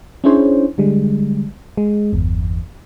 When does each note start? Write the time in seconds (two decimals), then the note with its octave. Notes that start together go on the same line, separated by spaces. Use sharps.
0.24 C#4 D4 E4 G#4 C5 C#5
0.78 D3 G3 G#3
1.77 G#3
2.13 G1 E2